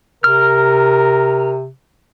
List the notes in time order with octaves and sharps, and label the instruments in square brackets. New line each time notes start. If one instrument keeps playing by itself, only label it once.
[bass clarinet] C3 [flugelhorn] A#4 [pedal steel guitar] F6